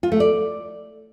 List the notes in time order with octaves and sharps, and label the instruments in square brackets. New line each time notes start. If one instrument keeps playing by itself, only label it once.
[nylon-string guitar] F4
A3
D5